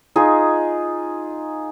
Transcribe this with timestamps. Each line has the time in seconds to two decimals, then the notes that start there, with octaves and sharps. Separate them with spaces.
0.16 D#4 F4 G#4